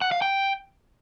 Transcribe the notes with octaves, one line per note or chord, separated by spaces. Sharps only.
F#5
F5
G5